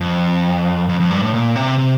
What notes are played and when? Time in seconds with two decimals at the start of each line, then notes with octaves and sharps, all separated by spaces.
0.01 F2
0.89 F2
1.00 F2
1.10 G2
1.22 A2
1.34 A#2
1.56 C3
1.78 C3